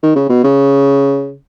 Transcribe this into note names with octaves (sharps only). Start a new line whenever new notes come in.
D#3
C#3
B2
C#3